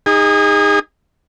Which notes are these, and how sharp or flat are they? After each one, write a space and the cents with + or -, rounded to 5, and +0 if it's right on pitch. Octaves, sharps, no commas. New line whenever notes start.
D#4 +0 G#4 -30